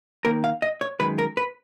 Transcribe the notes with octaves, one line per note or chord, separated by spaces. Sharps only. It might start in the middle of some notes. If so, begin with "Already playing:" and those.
D#2 D#3 A#3 A#4
F5
D#5
C#5
F#2 D#3 G#3 B4
A#4
B4